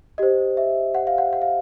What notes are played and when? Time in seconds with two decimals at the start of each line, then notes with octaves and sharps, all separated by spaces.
0.18 G4 C5 D#5
0.57 E5
0.95 F#5
1.07 F5
1.18 F#5
1.33 F#5
1.42 F5